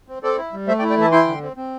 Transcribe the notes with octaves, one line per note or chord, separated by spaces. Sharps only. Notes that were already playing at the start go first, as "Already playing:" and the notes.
C4
C4 A4 D5
E4
G3
A3 C5 E5
D5 G5
E4
D5 G5
E3 E5 A5
E4 G5 C6
D3
C4
C4